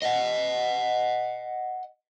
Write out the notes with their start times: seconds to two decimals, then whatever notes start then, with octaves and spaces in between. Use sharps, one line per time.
0.03 D#5 F#5